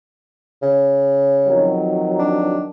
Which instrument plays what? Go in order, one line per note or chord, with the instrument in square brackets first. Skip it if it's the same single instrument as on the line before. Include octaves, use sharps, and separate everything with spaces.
[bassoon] C#3
[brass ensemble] F2 D#3 F#3
[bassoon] D4